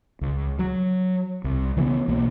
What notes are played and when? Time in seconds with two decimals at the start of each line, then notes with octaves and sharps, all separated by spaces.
0.21 C#2
0.59 F#3
1.44 C2
1.77 C#3 E3 A#3 B3
2.08 B1 A#3